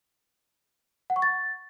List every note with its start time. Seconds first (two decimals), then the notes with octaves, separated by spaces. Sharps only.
1.10 F#5
1.16 C#6
1.22 A6